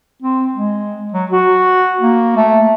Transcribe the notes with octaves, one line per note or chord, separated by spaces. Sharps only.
C4
G#3
F#3
F#4
A#3
A3